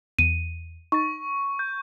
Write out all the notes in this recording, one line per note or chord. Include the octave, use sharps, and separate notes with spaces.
E2 D#7
D#4 C#6 A6
G6